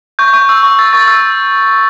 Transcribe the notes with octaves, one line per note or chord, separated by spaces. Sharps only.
C#6 G6
C#6
E6
C#6
E6 A6
C#6 A6
E6